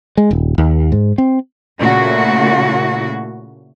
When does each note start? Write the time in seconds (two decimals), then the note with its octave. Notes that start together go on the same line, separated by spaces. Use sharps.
0.17 G#3
0.31 D#1
0.58 D#2
0.92 G#2
1.18 C4
1.77 A#2 C#3 A3 E4 F#4